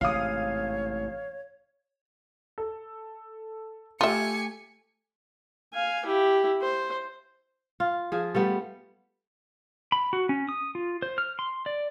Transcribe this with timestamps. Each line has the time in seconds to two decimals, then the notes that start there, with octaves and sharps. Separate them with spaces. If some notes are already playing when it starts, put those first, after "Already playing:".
0.01 A1 G#2 C3 C#5 F5 D#6
2.58 A4
4.01 A3 F4 G4 E5 G#5 C#7
5.73 F5 G#5
6.05 E4 G4
6.61 C5
7.80 F4
8.12 F3 G#4
8.35 G3 A3 B3
9.92 B5
10.13 F#4
10.29 C#4
10.49 D#6
10.75 F4
11.02 C5
11.18 F6
11.39 C6
11.66 D5